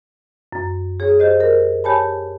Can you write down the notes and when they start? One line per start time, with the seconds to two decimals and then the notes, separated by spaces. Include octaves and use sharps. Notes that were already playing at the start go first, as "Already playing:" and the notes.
0.52 F#2
1.00 G#4 C#5
1.19 G4 C5 D#5
1.40 A#4
1.84 G4 C#5 G#5 A5 B5